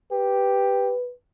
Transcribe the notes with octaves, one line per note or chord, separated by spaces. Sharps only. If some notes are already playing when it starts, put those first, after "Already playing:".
G4 B4